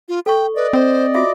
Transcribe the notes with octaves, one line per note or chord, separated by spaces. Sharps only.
F4
A4 G5 C#6
B4 D5 D#5
C4 C5
F4 F#4 E5 D6